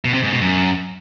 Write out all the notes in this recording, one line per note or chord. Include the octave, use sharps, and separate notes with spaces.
B2
C3
G#2
B2
F#2